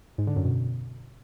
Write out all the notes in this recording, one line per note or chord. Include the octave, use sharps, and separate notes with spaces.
G#2
D3
F#2
B2